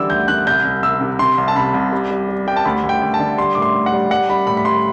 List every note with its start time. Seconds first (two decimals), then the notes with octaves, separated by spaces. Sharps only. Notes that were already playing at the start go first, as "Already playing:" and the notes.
Already playing: D3 E3 G3 D6 E6
0.10 D2 G6
0.28 D3 F#6
0.47 C2 G6
0.65 C2
0.82 C2 E6
1.01 C3
1.19 C3 C6
1.38 C2
1.48 A5
1.56 C3 B5
1.74 C2
1.92 G3
2.10 G3
2.29 G3
2.47 G3 G5
2.56 A5
2.65 D2 B5
2.83 D2
2.89 G5
3.02 D2
3.14 A5
3.20 D3
3.38 G3 C6
3.55 A2 D6
3.62 C6
3.75 A2
3.86 F#5
3.93 G3
4.11 G3 F#5
4.29 G3 B5
4.47 A2 B5
4.57 B5
4.65 G3 C6